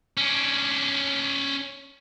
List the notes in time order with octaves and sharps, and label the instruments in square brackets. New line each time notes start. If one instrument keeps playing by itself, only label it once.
[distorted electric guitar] C#4 D4